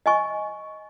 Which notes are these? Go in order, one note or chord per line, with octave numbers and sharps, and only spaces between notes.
D#5 G#5 C#6